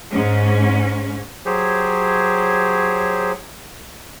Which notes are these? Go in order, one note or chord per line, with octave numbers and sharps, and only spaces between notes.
G#2 C#4
F#3 G4 G#4 C5 C#5